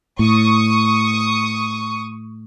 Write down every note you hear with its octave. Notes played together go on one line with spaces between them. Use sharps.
A2 C#6 D#6